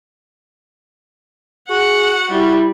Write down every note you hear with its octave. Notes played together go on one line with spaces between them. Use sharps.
F#4 G#4 F#5
G3 E4